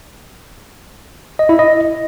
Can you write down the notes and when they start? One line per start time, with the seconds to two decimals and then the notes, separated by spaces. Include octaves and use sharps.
1.39 D#5
1.49 E4
1.59 D#5